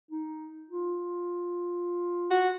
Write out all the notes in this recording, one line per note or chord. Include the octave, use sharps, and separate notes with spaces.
D#4
F4
F#4